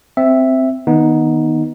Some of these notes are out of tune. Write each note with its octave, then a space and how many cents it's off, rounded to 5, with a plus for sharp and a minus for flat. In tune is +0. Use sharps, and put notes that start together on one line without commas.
C4 -5 E5 +0
D#3 +15 B3 -20 D#4 +5